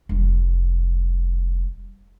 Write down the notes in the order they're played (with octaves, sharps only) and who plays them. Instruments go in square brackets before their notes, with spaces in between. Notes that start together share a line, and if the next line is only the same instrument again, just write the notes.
[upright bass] F1 G3